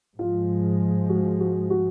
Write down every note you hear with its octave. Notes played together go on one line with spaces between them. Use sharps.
G#2 F3 G#3 F4
F#4
F#4
F#4